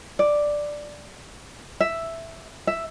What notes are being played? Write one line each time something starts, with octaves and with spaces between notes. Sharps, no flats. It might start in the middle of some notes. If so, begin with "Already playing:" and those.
D5
E5
E5